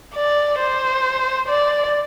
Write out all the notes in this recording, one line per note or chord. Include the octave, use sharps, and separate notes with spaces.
D5
C5
D5